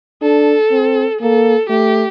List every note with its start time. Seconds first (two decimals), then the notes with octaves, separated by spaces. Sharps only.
0.22 D4 A4
0.71 C4
1.21 A#3 A4
1.70 A3 G4